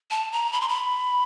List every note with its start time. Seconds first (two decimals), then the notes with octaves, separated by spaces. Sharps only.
0.11 A5
0.32 A#5
0.53 B5
0.61 C6
0.68 B5